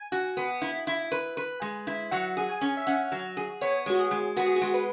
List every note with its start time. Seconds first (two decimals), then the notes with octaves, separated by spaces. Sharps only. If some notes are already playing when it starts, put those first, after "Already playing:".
Already playing: G#5
0.12 F#4
0.37 B3
0.62 E4
0.87 E4
1.12 B4
1.37 B4
1.62 G#3
1.87 E4
2.11 F#3 F#5
2.37 G#4
2.49 G#5
2.61 C#4
2.77 E5
2.87 C#4 F#5
3.12 F#3
3.37 G#4
3.61 B3 C#5
3.86 G#3 F#4
3.99 G#4
4.11 G#3
4.37 B3 F#4
4.46 G#4
4.56 F#4
4.61 G#3
4.74 B4